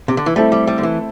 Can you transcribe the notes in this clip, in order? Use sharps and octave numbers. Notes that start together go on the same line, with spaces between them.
C3
D3
E3
G3 A3 C4 E4 A4
G3
G3
D3
E3